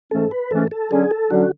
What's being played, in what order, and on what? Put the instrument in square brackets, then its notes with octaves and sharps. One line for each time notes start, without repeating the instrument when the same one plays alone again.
[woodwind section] G#2 E3 A3 C#4 [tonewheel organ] A4
[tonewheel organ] B4
[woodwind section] G#2 E3 A3 C#4 [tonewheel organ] A4
[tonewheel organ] A4
[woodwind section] D3 F#3 C#4 [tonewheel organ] G#4
[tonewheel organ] A4
[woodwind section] D3 F#3 C#4 [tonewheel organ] F#4